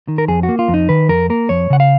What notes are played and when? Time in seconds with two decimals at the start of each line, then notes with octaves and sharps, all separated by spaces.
0.08 D#3
0.18 A#4
0.28 F2 G#4
0.43 F#4
0.49 A#3
0.59 F4
0.68 F2
0.74 D#4
0.89 D#3 B4
1.09 F2 A#4
1.30 A#3 A#4
1.49 F2 C#5
1.70 C#3 F#5
1.80 F5